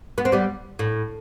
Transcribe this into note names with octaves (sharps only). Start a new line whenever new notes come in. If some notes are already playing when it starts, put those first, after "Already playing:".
B3
C4
G3 B3
A2